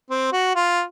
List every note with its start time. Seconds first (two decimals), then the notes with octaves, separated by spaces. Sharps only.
0.10 C4
0.32 F#4
0.55 F4